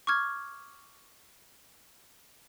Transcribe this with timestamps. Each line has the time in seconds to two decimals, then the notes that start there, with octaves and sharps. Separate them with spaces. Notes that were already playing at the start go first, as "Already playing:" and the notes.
0.07 C#6 D6 F6 G#6